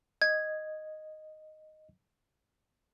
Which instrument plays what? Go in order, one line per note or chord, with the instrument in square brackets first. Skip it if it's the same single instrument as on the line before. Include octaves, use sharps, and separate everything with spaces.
[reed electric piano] D#5 [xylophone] G#6